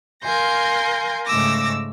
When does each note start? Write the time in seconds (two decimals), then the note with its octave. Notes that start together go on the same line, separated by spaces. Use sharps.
0.22 A#4 F5 G#5 C6 G6 A#6
1.26 G#2 C#3 A3 D6 E6 A#6